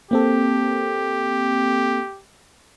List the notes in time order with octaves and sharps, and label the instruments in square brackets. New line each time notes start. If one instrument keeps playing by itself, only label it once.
[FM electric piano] A#3 C4 A4 [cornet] G4